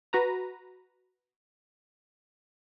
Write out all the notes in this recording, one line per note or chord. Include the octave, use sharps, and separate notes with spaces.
F#4 B4 A#5